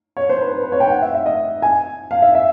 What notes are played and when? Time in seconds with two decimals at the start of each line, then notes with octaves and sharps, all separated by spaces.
0.17 C#5
0.29 C5
0.41 B4
0.53 B4
0.63 B4
0.72 C#5
0.80 G5
0.90 F#5
1.02 E5
1.14 E5
1.26 D#5
1.62 G#5
2.11 F5
2.22 E5
2.35 E5